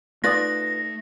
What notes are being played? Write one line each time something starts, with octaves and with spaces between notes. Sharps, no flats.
A3 D#4 F4 B4 D5 D#6 A#6